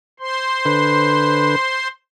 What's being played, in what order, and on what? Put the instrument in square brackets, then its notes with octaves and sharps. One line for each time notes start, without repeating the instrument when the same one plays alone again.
[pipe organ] C5 C6
[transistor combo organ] D3 B4